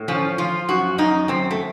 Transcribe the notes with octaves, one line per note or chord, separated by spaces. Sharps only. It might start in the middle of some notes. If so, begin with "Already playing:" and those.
Already playing: A2
F3 C#4
F3 F4
F#2 F#4
F#2 D#4
F#2 C4
A3